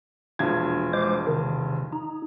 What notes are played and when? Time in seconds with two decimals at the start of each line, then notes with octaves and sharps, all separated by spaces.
0.39 E1 A#1 G#6
0.93 G#3 C5 D6
1.27 C3 D#3
1.93 D#4